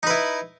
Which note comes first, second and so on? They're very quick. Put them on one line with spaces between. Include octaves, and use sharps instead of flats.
D#4 B4 E4